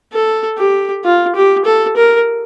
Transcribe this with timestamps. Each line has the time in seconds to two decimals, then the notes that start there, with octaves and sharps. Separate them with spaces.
0.13 A4
0.58 G4
1.05 F4
1.35 G4
1.65 A4
1.96 A#4